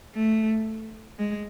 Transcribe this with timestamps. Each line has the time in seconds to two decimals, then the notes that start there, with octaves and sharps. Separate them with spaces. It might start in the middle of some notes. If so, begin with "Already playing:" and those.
0.15 A3
1.19 G#3